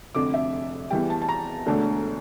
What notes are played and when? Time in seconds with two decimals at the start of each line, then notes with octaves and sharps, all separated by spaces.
0.15 F1 F2 D3 D6
0.34 E5
0.90 E2 E3 G3 G5
1.10 A5
1.22 A5
1.29 A#5
1.66 E1 D2 D3 A3 D4